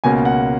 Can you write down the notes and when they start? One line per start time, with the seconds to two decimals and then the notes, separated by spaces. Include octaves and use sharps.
0.04 C#2 B2 A#3 C#4 G#5
0.25 F#5